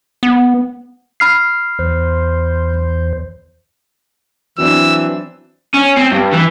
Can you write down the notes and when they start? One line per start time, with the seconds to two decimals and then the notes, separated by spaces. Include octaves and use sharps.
0.23 B3
1.20 B5 F6 C7
1.79 E2 C5
4.58 E3 F#3 C4 D4 E6
5.74 C#4
5.97 C4
6.12 G2
6.33 E3